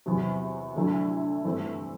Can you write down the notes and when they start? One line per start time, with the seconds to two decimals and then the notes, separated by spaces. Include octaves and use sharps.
0.06 E2 C3 F#3
0.76 D2 D3 F#3 A3 E4
1.45 G2 E3 A3 C4